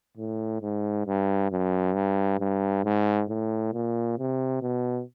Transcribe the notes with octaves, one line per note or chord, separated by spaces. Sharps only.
A2
G#2
G2
F#2
G2
G2
G#2
A2
A#2
C3
B2